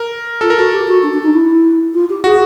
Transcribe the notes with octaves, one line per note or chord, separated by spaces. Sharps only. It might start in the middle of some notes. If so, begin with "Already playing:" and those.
Already playing: A#4
F4 A4
A#4
F#4 A4
G4
F#4
D4
D4
D#4
E4
F4
G4
F#4 G#4